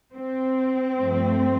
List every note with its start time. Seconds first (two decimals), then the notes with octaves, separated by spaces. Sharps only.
0.14 C4
0.99 G2 F3 A3